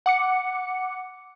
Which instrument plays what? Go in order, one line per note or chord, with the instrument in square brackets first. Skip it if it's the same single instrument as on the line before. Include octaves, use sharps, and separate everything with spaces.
[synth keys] F#5 D6 C#7